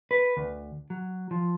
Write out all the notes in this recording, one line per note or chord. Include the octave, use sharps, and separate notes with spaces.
B4
D2
F#3
F3